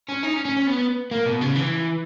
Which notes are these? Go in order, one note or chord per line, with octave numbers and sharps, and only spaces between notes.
C#4
D#4
C#4
C#4
C#4
B3
A#3
B2
C#3
E3